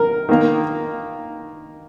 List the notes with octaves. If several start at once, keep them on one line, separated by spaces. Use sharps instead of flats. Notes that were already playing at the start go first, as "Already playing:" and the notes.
Already playing: A#4
D#3 A#3